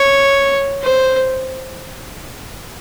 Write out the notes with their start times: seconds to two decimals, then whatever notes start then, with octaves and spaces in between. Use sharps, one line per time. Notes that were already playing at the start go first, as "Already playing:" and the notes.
Already playing: C#5
0.83 C5